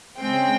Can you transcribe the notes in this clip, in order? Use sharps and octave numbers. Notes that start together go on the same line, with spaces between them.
C#3 G#3 C4 G5